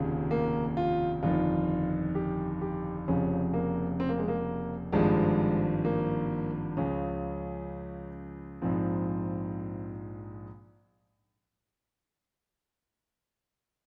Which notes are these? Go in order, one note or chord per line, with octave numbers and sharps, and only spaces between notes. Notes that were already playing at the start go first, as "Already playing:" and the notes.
Already playing: F1 D#2 C#3 F3
A#3
F4
G1 F2 D#3 F4
G4
G4
F1 F2 C#3 F3 C#4
A#3
C4
A#3
G#3
A#3
G#1 G2 F3 G#3
A#3
C#2 C#3 F3 C#4
A#1 G#2 F3 C4